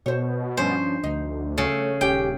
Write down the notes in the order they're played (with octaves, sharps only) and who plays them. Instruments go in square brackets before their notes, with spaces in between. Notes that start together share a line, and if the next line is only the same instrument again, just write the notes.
[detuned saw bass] B2 [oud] C5 C#5
[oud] G2 F3 C#4 [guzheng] C5
[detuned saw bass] D2 [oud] D#4
[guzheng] C#3 [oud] A3
[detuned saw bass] D#1 [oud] C#4 G4 [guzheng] G5